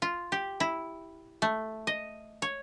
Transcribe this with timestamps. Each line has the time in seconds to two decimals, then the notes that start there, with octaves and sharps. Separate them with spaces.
0.02 F4
0.32 G4
0.60 E4
1.42 A3
1.87 D#5
2.42 C#5